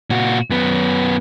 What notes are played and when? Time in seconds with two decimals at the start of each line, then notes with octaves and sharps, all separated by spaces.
0.10 A#2 F#4
0.50 F#2 B3